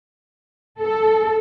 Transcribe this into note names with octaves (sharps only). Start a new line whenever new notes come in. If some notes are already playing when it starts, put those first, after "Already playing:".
A4